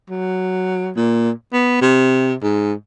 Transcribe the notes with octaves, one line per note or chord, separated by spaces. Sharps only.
F#3
A#2
B3
C3
G#2